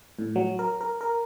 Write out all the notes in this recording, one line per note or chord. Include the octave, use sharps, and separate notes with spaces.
A2
F#3
A#4
A#4
A#4